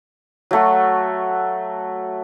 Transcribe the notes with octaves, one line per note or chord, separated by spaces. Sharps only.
F#3 A3 F#4